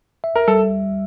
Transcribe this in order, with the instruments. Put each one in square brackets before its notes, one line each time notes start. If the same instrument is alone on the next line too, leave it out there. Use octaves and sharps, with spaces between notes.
[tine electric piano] E5
[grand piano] A#4
[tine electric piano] G3 [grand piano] A4